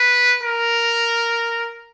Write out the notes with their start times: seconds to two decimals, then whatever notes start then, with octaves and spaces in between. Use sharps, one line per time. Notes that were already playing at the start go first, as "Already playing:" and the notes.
Already playing: B4
0.43 A#4